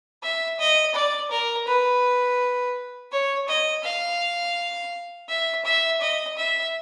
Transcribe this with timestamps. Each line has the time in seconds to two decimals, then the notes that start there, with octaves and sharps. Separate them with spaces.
0.22 E5
0.59 D#5
0.94 D5
1.31 A#4
1.67 B4
3.12 C#5
3.48 D#5
3.84 F5
5.29 E5
5.65 E5
6.01 D#5
6.37 E5